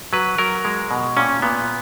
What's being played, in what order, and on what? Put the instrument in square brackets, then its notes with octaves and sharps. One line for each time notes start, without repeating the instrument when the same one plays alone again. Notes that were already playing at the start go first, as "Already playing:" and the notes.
[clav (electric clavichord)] F#3 B4
F#3 A#4
G#3
B2
A#2 C#4
A#2 B3